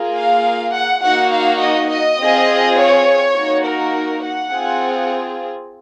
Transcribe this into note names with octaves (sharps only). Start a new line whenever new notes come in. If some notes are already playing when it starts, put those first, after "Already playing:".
Already playing: A#3 F4 G#4
F5
F#5
A#3 D#4 F#4 F#5
F5
D#5
D#5
C4 F4 G#4
C#5
A#3 D#4 F#4
A#4
F#5
C4 F4 G#4